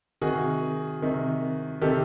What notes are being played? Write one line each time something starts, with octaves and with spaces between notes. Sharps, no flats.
C3 D#3 F#4 G#4
C3 D#3
C3 D#3 G4 A4